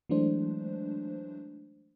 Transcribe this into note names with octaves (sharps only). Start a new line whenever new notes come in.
E3 F#3 G#3 A3 D4 C5